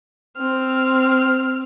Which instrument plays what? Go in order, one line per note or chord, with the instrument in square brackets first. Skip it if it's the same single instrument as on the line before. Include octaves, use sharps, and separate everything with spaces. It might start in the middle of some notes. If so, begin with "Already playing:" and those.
[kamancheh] C4 F6